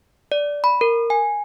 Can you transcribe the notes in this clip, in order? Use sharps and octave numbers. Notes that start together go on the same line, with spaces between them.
D5
B5
A#4
G#5